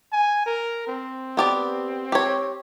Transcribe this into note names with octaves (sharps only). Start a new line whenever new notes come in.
G#5
A#4
C4
B3 G4 D5
G4 C#5